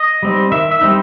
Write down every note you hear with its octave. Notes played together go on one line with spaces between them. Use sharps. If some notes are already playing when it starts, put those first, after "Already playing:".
Already playing: D#5
G3 C4 D#4
D#3 E5
E5
G3 C4 D#4